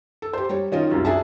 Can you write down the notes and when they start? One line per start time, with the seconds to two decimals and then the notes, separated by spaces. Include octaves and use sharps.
0.22 A4
0.33 G4 C5
0.49 G3 C#5
0.72 D#3 C#4 F4 D#5
0.91 C2 F#2
1.05 D4 G#4 E5 A5